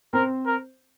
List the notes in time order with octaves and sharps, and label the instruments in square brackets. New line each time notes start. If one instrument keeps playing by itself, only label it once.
[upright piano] C4 C5 [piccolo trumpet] A#4
[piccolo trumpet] A#4